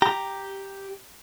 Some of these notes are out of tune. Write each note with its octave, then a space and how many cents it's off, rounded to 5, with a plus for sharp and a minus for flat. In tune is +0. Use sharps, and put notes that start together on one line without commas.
G4 +0 A#5 +0